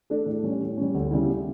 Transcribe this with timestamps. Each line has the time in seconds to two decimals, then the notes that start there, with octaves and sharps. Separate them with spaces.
0.10 A3 D4 A4
0.26 A2
0.44 G3 C#4
0.61 A2
0.77 G3 C#4
0.94 D2
1.11 C#3 G3 B3 E4